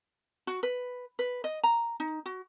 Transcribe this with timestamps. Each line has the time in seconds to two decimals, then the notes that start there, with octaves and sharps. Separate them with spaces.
0.47 F#4
0.63 B4
1.19 B4
1.44 D#5
1.63 A#5
2.00 D#4
2.26 F#4